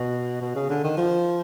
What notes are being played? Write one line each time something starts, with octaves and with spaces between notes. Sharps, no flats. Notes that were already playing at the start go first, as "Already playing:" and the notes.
Already playing: B2
B2
C#3
D3
D#3
F3